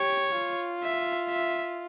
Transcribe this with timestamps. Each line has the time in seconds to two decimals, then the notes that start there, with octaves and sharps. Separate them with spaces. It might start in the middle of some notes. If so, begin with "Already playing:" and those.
Already playing: G4 C#5
0.38 F4
0.83 E5
1.29 E5